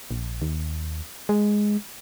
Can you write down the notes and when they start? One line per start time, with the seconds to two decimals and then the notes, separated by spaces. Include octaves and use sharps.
0.11 A#1
0.42 D#2
1.29 G#3